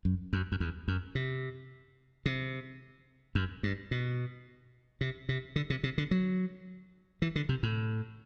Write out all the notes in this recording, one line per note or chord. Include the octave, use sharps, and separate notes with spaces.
F#2
F#2
F#2
E2
F#2
C3
C3
F#2
G2
B2
C3
C3
D3
C3
C3
D3
F#3
E3
D3
C3
A2